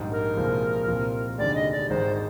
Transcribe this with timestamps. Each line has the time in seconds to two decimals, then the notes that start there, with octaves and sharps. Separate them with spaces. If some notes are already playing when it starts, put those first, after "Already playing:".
Already playing: A#1 G#2 D#3 G3
0.11 A#4
0.36 C2 A#2 F3 G#3
0.87 C2 A#2 F3 C4 F4
1.38 F1 D#2 D3 G#3 D5
1.55 D#5
1.71 D5
1.89 G#1 G#2 D#3 G#3 C5